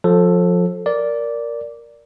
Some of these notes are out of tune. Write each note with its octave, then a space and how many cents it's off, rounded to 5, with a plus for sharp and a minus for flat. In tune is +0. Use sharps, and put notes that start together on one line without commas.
F3 +30 A4 +0
A#4 +0 D5 -10